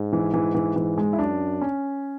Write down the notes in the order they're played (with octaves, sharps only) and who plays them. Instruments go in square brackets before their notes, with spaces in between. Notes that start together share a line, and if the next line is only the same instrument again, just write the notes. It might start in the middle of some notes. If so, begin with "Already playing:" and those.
Already playing: [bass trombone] G#2
[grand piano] E3
E3
E3
E3
G#3
E4
[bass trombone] F#2 [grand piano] D4
[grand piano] C#4